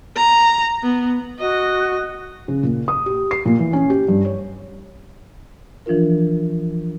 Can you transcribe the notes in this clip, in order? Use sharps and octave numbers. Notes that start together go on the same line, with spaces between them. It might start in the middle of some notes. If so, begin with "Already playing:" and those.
A#5
B3
F#4 D#5
C#3
A#2
D#6
G4
C7
A#2
E3
C#4
G4
G2
C#5
E3 F3 D4 F4 A#4